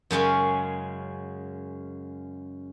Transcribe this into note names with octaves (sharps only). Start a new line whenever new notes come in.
F#2 C#3 G#3 C#4